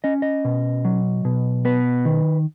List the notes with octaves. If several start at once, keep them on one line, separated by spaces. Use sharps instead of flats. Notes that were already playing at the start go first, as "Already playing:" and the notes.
C#4 D#5
D#5
B2
F#3
B2
B3 B4
D#3